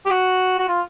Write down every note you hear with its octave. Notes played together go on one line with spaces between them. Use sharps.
G4
F#4
F#4
F4